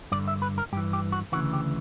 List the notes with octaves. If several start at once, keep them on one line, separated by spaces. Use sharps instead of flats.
G2 D3 D5
E5
B4
A#4
G2 E3 G4
G4
F#4
D2 C#3 E3 F#4
G4